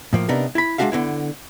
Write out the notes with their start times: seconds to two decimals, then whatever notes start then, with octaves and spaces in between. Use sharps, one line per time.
0.13 A2 F3 A#3
0.28 C3 B3 D4 D#4 A#4
0.55 E4 B5
0.78 G#3 C4 D4 F#4 E5 F5
0.92 D3 B3 E4